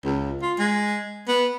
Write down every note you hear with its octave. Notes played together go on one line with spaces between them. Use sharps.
C#2
F4
G#3
B3